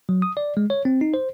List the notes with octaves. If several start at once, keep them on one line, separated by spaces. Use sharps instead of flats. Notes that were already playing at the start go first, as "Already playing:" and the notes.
F#3
D#6
D5
G#3
C#5
C4
D#4
C5